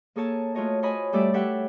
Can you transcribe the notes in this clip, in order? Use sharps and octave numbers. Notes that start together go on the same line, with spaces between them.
A#3 G#4 A4 C#5 A5
A3 F4 F#4 C#5 D#5
C5 C#5 D#5 G#5 B5
G3 A3 G4 A4 D5 E5
G4 A4 C#5 E5 F#5 G5